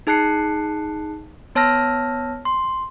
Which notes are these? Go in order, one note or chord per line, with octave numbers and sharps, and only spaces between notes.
D#4 G#4 A5 F#6 C7 C#7
B3 C#5 A5 E6 F6 A#6
C6